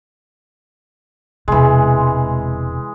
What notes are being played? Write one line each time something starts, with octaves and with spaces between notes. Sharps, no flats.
E1 C3 E3 G#3